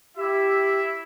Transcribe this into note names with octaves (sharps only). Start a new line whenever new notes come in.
E4 G4 E5